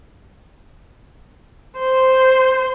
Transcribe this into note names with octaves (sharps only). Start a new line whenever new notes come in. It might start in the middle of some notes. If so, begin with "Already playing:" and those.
C5